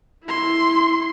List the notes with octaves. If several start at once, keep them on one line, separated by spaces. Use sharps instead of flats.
E4 C6